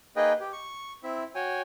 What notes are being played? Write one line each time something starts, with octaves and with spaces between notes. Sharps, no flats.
A#3 D#4 G#4 B4 D#5 G5
G4
C#6
C4 E4 E5
F#4 C#5 G5 G#5